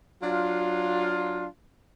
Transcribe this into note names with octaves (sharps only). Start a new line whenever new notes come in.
F#3 D4 F4